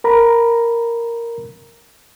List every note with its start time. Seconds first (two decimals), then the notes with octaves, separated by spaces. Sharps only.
0.04 A#4 A#5 B5